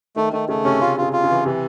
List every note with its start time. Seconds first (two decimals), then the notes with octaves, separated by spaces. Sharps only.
0.16 D#3 A3
0.32 D#3 A3
0.48 C#3 A3
0.65 C3 C#4
0.81 C#3 F4
0.97 C#3 F4
1.13 F4
1.24 C#3
1.30 E3
1.45 C3 E3